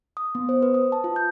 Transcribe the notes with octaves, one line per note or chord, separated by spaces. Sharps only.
D#6
B3
C5
B4
D#6
A5
F4
G6